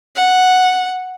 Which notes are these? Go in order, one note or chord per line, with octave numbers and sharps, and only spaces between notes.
F#5